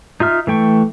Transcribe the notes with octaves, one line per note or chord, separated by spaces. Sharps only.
D#4 F4 E5 F6
E3 A3 G5 C#6